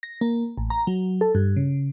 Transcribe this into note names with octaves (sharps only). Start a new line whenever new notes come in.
A#6
A#3
A1
A#5
F#3
A4
G2
C#3